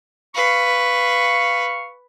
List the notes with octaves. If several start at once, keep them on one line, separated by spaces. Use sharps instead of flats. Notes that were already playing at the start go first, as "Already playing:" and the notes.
B4 F5 C#6